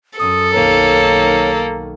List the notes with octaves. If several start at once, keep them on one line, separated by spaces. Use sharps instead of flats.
F#2 A4 D#6
B1 D#3 A#3 C#5